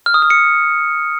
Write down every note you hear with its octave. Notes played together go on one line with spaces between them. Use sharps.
F6
D#6
F6
C#7